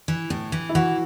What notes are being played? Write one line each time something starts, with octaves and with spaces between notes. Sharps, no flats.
E3
A2
E3
E4
E3 F#4